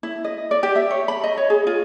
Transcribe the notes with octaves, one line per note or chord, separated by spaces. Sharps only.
E4
D#5
D5
G4
E5
C#5
B5
D#5
C#5
G#4
F4